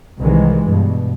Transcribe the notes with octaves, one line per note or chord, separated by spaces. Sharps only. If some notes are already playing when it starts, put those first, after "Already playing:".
C2 D#3 E3 G#3
G2 B2